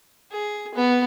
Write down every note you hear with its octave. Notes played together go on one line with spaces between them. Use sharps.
G#4
B3